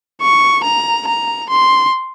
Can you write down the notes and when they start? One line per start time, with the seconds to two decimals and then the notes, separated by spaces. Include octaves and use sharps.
0.22 C#6
0.64 A#5
1.08 A#5
1.50 C6